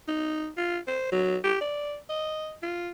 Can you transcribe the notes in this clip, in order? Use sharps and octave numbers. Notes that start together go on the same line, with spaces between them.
D#4
F4
C5
F#3
G4
D5
D#5
F4